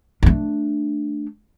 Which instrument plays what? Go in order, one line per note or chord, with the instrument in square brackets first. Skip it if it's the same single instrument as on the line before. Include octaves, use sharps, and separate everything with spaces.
[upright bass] A3 D4